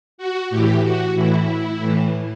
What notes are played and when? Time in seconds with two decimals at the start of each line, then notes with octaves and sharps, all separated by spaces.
0.18 F#4
0.50 A2 G4
0.55 E3
0.84 F#4
1.15 A2 E3 E4
1.80 A2 E3